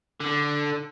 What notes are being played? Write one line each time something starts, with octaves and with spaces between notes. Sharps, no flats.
D3